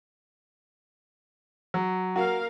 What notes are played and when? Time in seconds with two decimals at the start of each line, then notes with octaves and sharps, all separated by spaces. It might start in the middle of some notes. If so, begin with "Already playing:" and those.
1.74 F#3
2.16 A#3 F#4 A#4 F5